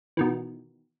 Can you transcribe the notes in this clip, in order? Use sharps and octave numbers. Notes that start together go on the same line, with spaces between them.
B2 D#3 E3